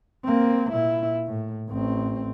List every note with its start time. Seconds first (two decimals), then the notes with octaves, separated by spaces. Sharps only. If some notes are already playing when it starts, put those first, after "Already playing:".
0.25 A#3 C4
0.72 A#2 E4
1.26 A2
1.69 A1 C4